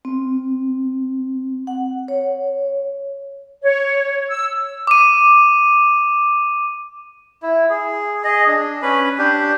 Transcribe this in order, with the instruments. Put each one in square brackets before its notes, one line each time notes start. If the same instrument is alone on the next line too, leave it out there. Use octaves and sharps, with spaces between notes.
[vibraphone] C4
F#5
C#5
[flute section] C#5
E6
[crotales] D6 D#7
[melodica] E4
G#4
G#4 D#5
D4
C#4 B4 B5
D4 G4